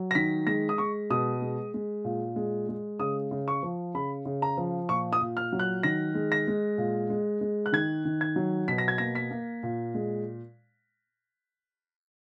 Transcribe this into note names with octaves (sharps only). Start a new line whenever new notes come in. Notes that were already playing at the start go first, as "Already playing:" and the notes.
Already playing: F#3
A#6
D#3 B6
G#3 A#6
D#6
G#3 C#6
B2 D#6
G#3
G#3
A#2
G#3
G#3
C#3 D#6
C#3
C#6
F3
C#3 B5
C#3
A#5
F3
A#2 C#6
D#6
A#2
F6
F#3
F#6
D#3 A#6
G#3
A#6
G#3
A#2
G#3
G#3
F#6
D#3 G#6
D#3
G#6
F#3
B2 B6
A#6
G#6
A#3 A#6
B6
A#3
A#2
G#3